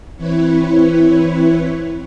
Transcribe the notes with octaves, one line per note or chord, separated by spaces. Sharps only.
E3 C4 E4 B4 C#5